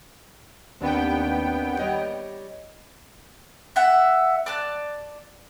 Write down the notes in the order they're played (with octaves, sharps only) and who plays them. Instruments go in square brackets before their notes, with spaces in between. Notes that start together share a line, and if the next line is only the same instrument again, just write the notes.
[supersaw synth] D#2 B3 G5 [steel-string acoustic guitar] C4 D4
[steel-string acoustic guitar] G3 C#5 D#5
[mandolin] E5 F#5
D5 A5 F#6